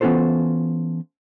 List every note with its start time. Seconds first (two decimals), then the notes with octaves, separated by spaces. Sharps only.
0.01 E3 B3 C#4 F4 A4 C5